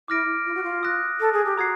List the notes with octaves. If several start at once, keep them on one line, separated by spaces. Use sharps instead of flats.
E4 D6 F6 A#6 D7
F4
F#4
F4
D#6 F#6 A#6
A4
G#4
G4
F#4 A#5 D#6 G#6 C7